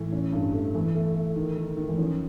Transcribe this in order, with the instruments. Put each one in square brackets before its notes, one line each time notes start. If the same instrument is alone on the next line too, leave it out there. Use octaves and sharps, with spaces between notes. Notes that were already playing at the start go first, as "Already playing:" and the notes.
Already playing: [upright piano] A2 [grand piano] E3
[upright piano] C#4
G2
A3
[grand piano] E3 [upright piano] A3
[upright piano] A3
A3
D#3
D#3
D#3
[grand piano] E3
[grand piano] F3 [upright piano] C#4